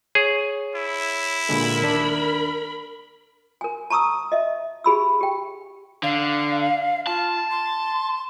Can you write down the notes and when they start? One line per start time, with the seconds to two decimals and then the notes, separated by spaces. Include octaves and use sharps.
0.15 G#4 C#5
0.75 E4
1.49 A#2 D3 G#3 A#4 B5
1.82 D#2 D4
3.61 A#4 G#5
3.90 A5 A#5 C#6 D#6 E6
4.32 D#5 E5
4.84 G4 G#4 B5 E6
5.21 G4 G5
6.03 D3 F5
7.07 F4 A5
7.51 C6